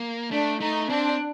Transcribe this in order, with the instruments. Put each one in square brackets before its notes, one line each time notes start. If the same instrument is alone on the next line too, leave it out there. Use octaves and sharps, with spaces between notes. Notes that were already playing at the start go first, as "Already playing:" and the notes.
Already playing: [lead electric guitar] A#3
[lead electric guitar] A3 [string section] D4
[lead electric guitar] A3 [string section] D#4
[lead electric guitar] C4 [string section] D4